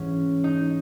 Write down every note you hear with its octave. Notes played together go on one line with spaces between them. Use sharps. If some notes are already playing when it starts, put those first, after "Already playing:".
Already playing: G#2 E3 G#3 C#4
D#4